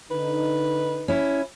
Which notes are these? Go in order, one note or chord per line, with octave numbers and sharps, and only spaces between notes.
D3 D#4 B4
C#4 E4